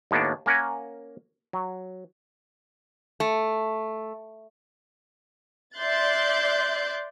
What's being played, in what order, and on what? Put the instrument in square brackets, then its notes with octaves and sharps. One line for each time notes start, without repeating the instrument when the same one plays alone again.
[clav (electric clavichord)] D#2 A2 A#3 B3 D4
A#3 C#4 A#4 F#5 G#5
F#3
[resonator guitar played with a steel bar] A3
[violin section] D5 E5 C6 F#6 G6 A6